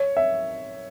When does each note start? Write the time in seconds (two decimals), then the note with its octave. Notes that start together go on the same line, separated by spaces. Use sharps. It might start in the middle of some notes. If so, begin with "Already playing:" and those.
Already playing: C#5
0.17 E5